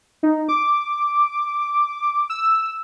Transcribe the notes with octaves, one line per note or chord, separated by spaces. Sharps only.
D#4
D6
E6